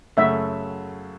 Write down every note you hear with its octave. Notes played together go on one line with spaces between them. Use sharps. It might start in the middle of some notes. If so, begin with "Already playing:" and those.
F#2 C#3 F#3 A3 E5